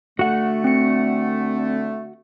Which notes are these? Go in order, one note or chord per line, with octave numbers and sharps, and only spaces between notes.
D3 A3 F#4 F#5
C4 C#7